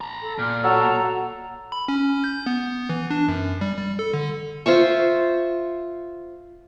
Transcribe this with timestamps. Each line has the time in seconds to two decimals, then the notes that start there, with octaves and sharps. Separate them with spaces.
0.01 A5 A#5
0.22 A4
0.38 A#2 F6
0.64 F#3 F#4 A4 A#5
1.72 B5
1.88 C#4
2.24 G6
2.46 B3
2.89 E3
3.10 D4
3.28 F#2
3.61 G3
3.78 G3
3.99 A4
4.14 D3
4.66 F4 C5 E5 C#6